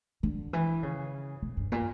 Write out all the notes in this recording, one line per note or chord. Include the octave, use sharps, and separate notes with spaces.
D3
E3
C#3
B2
G2
A#2